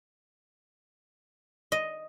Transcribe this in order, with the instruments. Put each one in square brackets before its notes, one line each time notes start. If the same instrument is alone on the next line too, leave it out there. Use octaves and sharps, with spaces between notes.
[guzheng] D#5